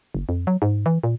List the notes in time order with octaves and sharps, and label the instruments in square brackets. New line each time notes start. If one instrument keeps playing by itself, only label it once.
[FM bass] F#1
F2
F#3
G#2
E3
A#2